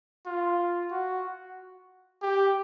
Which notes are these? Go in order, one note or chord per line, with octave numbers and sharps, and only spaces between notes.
F4
F#4
G4